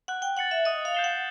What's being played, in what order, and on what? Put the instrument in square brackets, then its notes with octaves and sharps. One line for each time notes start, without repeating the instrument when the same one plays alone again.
[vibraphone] F#5 [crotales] F#6
[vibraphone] G5
[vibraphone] F#5 [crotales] A6 C#7 F#7
[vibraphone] E5
[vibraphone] D#5 [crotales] D#6
[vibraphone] F5
[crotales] G6 C7 E7 G7
[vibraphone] F#5